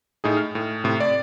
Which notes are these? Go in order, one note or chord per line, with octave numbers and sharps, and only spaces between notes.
A2 D#4 G#4
F6
A2
A2 C3
D5